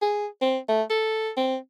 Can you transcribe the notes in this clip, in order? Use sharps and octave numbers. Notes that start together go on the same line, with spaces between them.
G#4
C4
A3
A4
C4